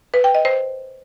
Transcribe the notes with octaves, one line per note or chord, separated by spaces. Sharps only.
B4
G5
D#5
C5